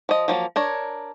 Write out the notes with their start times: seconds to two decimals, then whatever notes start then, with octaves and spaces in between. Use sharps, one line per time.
0.09 F3 D#5
0.28 F3 F#3 A#3
0.56 D4 A#4 C#5